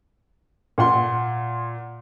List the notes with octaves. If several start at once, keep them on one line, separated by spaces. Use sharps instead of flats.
A#2 F#5 C6